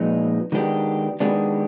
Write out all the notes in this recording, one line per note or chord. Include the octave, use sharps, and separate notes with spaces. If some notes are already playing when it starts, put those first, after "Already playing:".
Already playing: A#2 F3 G#3 B3 D#4
D#3 G#3 B3 D4 G4
D#3 G#3 B3 D4 G4